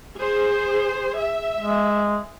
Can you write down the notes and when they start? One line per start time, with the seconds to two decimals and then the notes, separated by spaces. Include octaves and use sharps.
0.16 G#4 C5
1.17 E5
1.58 G#3